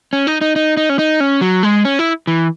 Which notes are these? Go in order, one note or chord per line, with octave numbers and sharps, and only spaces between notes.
C#4
D#4
D#4
D#4
D#4
C#4
D#4
C#4
F#3
G#3
C#4
E4
E3